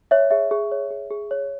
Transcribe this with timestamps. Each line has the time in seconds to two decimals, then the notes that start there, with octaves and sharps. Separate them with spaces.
0.11 C#5 E5
0.30 G#4 E5
0.51 G#4
0.72 C#5
0.91 G#4
1.11 G#4
1.31 C#5